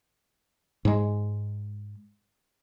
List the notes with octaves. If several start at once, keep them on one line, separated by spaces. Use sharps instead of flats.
G#2 G#3